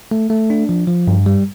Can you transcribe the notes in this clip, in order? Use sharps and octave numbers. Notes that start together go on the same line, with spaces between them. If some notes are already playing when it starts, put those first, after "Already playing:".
A3
A3
D4
F3
F3
G2
G3